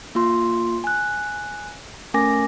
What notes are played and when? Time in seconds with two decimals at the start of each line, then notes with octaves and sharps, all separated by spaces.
0.15 A#3 F4 C6
0.84 G#5 F#6
2.14 A3 C#4 A#4 G#5 D6 A#6